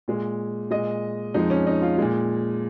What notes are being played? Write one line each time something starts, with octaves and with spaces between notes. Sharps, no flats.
A#2 G#3
A#2 G#3 D#5
F2 F3 G#3 D#4
C#4
D#4
F4
A#2 G#3